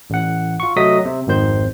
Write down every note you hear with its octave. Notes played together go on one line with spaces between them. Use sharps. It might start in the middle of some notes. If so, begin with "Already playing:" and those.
A1 F#5
F4 C#6
C3 F#3 A3 D#5 D#6 B6
C3
G#1 F2 D#3 C5 G6